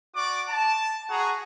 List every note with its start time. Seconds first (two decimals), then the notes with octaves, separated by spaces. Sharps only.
0.15 F#4 D5 D6
0.48 A5
1.09 F#4 G#4 F#5 A#5